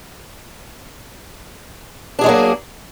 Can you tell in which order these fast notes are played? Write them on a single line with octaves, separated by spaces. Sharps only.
D4 G#4 G#3 F#3 A#3